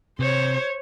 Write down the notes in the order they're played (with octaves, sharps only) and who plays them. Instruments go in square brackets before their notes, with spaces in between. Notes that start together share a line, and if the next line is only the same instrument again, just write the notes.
[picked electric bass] C3 [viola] C5 C#5